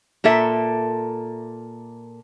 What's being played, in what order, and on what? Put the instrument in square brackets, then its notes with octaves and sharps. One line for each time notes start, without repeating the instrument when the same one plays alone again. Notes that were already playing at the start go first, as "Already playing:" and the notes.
[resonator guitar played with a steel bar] A#2 A#3 A4 E5